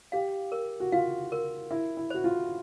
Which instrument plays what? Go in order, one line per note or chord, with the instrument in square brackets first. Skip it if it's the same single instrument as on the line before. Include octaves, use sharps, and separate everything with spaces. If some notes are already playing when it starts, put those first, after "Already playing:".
[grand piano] G4 [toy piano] F5
[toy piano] A#4
[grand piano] F#4
[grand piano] F4 [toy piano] F5
[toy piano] A#4
[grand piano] E4 [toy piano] E5
[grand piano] E4
[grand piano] F#4 [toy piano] C5
[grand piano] F4